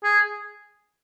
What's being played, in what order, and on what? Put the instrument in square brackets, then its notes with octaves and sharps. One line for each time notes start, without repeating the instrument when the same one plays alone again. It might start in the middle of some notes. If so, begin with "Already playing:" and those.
[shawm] G#4